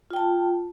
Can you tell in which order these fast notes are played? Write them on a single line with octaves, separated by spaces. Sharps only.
F4 G5 A5